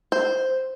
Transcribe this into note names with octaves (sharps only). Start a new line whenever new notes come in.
C5